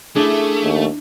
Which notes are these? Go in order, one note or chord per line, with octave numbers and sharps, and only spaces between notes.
A3 D4 E4 G#4
D#2